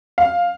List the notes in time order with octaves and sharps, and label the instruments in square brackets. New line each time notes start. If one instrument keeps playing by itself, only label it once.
[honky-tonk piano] F5